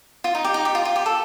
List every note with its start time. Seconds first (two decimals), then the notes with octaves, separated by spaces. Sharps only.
0.24 F4
0.35 D#4
0.44 G4
0.54 D#4
0.65 G4
0.75 F4
0.85 F4
0.96 G4
1.06 A4